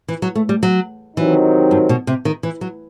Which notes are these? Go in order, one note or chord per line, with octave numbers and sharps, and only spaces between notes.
E3
F#3
A3
G3
F#3
C3 D#3 E3 F#3 C4 D#4
G2
B2
C3
D#3
E3
F#3